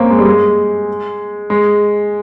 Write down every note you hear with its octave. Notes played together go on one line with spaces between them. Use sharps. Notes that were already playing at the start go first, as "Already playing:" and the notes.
Already playing: A#3 C4 C#4
G#3
G3
G#3
G#3